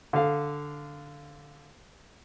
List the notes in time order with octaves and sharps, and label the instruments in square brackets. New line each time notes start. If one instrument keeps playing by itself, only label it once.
[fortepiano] D3 F5